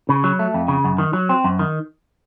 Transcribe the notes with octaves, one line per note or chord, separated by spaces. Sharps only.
C#3
F#3
A3
F2
C#3
F#2
D#3
F#3
C4
F#2
D#3